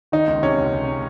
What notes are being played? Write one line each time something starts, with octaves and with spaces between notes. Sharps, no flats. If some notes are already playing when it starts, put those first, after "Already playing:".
D#3 D#4
C#2
C3 C#4
C#2
C#2
C3